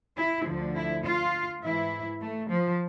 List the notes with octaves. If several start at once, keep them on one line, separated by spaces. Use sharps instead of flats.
E4
D2 D3 F3
E4
F4
G#2 E3 E4
A3
F3